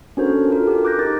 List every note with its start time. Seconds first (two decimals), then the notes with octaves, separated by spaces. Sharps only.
0.17 C#4 D4 F#4 A4 A#4 C5
0.50 F4 F#4 A4 A#4
0.67 G4 A#4
0.85 D6 F#6 G6 A#6
0.99 D#4 A#4 D6 A6